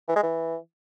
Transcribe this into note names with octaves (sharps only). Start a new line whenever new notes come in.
E3
G#3
E3